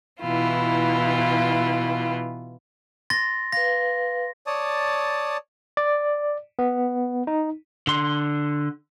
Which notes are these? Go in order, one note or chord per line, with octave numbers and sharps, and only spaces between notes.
B2 E3 E4 F4
C6 A6 A#6
B4 F5 A#6
C#5 D5 A5 D#6
D5
B3
D#4
D3 C6